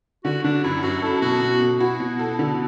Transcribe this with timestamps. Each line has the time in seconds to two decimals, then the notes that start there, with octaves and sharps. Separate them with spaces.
0.24 D3 F#4
0.44 D3 D4
0.64 F#2 E4
0.83 F#2 F#4
1.02 E4 A4
1.22 B2 F#4
1.42 B2
1.60 B2
1.80 E4 F#4
2.00 B2
2.19 A4
2.39 D3